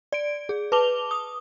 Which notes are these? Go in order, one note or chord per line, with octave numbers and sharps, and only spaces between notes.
D5 D7
G#4
B4 A5 D6 F7 G7
D#6